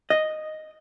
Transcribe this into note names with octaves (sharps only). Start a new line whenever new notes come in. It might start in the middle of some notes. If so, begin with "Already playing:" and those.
D#5